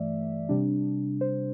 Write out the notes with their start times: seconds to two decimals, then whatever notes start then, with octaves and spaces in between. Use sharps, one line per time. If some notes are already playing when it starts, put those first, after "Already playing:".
Already playing: G2 E3 A3 D5 E5
0.49 C3 G3 D4
1.21 C5